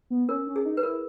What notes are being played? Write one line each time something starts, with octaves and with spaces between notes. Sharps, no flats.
B3
C#4 A#4
C#4
G#4
D#4
B4
E4 A#4